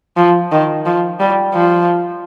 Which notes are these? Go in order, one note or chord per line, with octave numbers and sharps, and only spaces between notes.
F3
D#3
F3
G3
F3